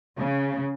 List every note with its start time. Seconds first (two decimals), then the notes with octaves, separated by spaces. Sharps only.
0.17 C#3